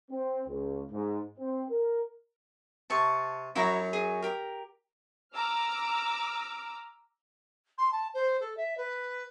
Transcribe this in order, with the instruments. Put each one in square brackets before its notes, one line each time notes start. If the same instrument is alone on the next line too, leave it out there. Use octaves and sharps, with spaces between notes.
[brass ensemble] C4
C#2
G#2
C4
A#4
[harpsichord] C3 [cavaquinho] A5 C#6
[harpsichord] F#2 F#3 [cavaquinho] E4 F#4 A#5
[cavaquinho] G#4
G4 A#4
[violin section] A#5 D6 E6 F6
[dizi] C6
A5
C5
A4
E5
B4